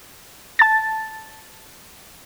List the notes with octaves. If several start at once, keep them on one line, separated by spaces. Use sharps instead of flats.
A5 A6